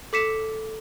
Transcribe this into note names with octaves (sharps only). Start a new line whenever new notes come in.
A4 D6 B6 C#7 E7